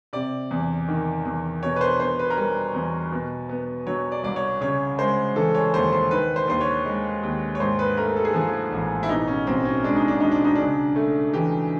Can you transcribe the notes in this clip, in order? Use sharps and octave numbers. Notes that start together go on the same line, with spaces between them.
C3 D5
E2
D#3
E2
B2 C#5
B4
C5
B3 C5
B4
A#4
G3 B4
E2
B2
B3
F#3 C#5
D5
C2 D5
C#5
C#3 C#5
G#3 C5
E3 A4
C#5
D#2 C5
C5
D#3 B4
C5
D#2 C5
C#5
G#3
D#2
C#5
G#2 C5
B4
A3 A#4
A4
G#4
F3 A4
A1
E4
B2 D#4
C#4
B1 C4
C#4
G#3 D4
D#4
D4
B1 D#4
D4
D#4
C#3 D4
A3
E3 G4